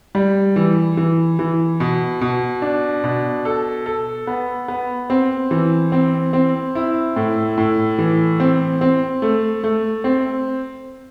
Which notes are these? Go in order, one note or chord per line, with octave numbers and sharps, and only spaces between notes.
G3
E3
E3
E3
B2
B2
D4
B2
A4
A4
B3
B3
C4
E3
C4
C4
E4
A2
A2
E3
C4
C4
A3
A3
C4